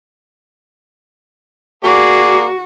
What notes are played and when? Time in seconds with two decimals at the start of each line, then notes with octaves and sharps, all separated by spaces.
1.84 A#3 F#4 G#4 D5